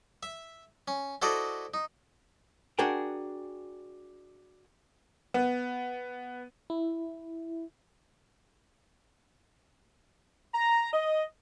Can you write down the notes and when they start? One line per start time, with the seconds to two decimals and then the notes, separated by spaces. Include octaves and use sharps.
0.23 E5
0.88 C#4
1.22 E4 F#4 A4 C5 D5 D#5
1.74 D#4
2.79 D4 F#4 G#4 A#4 F#5 G5
5.34 B3
6.70 E4
10.55 A#5
10.93 D#5